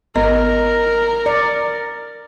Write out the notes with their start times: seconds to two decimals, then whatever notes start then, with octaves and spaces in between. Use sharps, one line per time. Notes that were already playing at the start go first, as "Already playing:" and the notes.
0.16 G#1 B3 A#4 D#5 A#5
1.26 D5 C#7